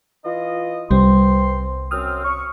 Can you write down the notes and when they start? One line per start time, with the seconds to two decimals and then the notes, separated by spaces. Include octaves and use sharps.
0.25 E3 F4 D#5
0.91 C2 G3 B3 C4 C6
1.91 F#2 C4 D#6 F6
2.24 C#6